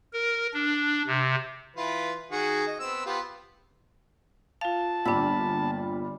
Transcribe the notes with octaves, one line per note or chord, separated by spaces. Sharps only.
A#4
D4
C3
E3 F4 B4
D#3 F#4 G#4
D#5
B3 C4 E6
B3 F4 G4
F4 F5 A5
G1 A#2 G3 D4 B5 E6